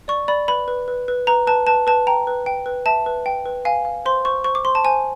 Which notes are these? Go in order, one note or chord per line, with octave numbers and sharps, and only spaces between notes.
D5 C#6
D5 B5
B4 B5
B4
B4
B4
B4 A#5
B4 A5
B4 A5
B4 A5
G5 A#5
B4
G5
B4
E5 A5
B4
G5
B4
F5 G#5
F5
C5 C6
C5 C#6
C5 C#6
D6
C5 C6
A5
C5 G#5